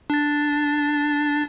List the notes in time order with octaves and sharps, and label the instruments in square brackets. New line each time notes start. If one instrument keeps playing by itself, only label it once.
[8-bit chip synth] D4 A6